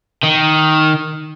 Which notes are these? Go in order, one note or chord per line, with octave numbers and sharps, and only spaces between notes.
D#3